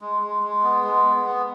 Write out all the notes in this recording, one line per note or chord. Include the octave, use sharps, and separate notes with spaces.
G#3
G#3
G#3
B3
G#3
B3
B3